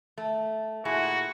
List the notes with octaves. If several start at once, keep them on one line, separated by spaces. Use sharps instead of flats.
A3
A#2 E4 F#4 G#4